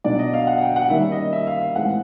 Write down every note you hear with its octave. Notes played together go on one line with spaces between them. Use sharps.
B2 F#3 B3 D4 D5
D#5
F5
F#5
F#5
G5
F#5
D#3 G3 A#3 C#4 E5
D#5
E5
F5
F5
A2 E3 G#3 C4 F#5